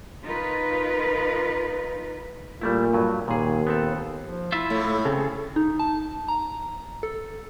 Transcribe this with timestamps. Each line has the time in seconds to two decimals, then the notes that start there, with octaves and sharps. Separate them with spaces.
0.23 D#4 F4 A#4 B4
2.61 A#2 G3 A3 E4
2.93 G2 F#3
3.28 D#2 A#2 G#4
3.67 B3 C4 A4
4.24 F3
4.52 E4 F4 E5
4.70 A2 A3
5.05 C#3 C4 G#4 A4
5.56 D#4
5.79 A5
6.28 A#5
7.03 A4